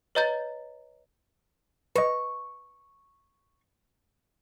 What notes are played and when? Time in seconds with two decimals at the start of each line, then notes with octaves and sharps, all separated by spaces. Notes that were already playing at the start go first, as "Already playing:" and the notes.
0.15 B4 C#5 D#5 A#5 G6 A6
1.96 B4 D#5 C#6